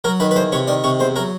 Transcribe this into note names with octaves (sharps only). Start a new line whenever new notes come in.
F#3 A#4
D#3 B4
B4
E2 C5
C3 C#5
D#3 D5
C3 C#5
E2 C5
F#3 A#4